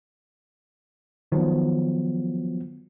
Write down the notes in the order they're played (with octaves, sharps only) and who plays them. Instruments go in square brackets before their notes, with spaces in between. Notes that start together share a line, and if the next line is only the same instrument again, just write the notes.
[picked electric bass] D#3 [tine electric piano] F3 F#3 B3